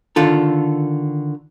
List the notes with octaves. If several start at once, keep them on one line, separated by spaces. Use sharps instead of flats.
D3 D#3 F4 A4